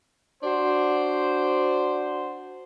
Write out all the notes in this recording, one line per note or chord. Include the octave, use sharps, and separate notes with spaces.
D4 F#4 C5